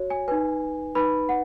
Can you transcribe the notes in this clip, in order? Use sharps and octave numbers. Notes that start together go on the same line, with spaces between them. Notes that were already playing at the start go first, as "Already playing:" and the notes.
Already playing: F#4 C#5
G#5
D#4 B4 G#5
D#4 B4 B5
F#5